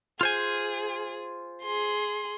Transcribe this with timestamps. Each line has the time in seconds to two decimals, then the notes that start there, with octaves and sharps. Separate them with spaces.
0.21 F4 G#4 C5 G#5
1.62 G#4 C6